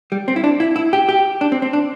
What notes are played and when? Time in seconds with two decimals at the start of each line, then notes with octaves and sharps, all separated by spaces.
0.12 G3
0.28 C4
0.36 E4
0.44 D4
0.60 E4
0.76 E4
0.93 G4
1.09 G4
1.41 D4
1.52 C4
1.62 C4
1.73 D4